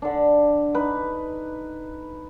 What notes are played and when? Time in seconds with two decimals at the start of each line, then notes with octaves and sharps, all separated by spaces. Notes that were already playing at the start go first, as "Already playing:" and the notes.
0.02 D3 D4
0.75 D#4 B4